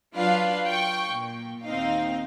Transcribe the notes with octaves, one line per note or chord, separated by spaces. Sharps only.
F#3 D4 F4 B4 D5 F5
G5 C#6
A#2
D#2 C4 D#4 F5